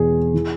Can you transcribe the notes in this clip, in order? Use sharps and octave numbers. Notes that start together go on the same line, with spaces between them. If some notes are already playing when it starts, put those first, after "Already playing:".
Already playing: E2 B2 G#4
E3